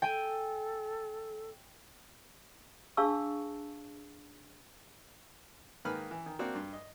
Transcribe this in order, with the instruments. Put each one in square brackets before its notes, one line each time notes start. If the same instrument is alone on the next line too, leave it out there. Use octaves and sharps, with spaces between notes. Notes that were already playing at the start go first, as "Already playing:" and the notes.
[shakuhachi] A4 [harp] G5 G#5
[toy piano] D4 G#4 F5 A5 C#6 E6
[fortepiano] G#2 D#3 A#3 B4 B5 F6
E3
D#3
A#3 C4 D4 F#4
G2
D#5